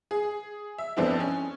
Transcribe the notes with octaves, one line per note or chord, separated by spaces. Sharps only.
G#4
E5
F2 B3 C4 D4 E4
C#4